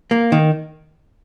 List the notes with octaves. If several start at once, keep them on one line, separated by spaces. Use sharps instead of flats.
A#3
D#3